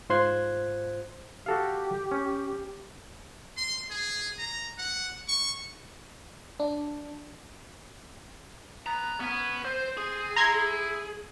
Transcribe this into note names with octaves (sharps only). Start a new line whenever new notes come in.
G#2 F4 C5 C6 F#6 G#6
F#4 G4 A4 F5
C#4
C6
G#4
A#5
F#5
C#6
D4
B3 A#5
B3 C#4
C4 C5
G#4
E4 A#5 C6 G#6